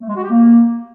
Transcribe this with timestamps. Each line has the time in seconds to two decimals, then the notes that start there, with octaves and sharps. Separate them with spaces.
0.01 A3
0.08 G#3
0.15 F#4
0.22 G4
0.29 A#3